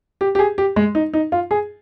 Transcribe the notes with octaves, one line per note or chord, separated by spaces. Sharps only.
G4
G4
G#4
G4
G#3
D#4
D#4
F4
G#4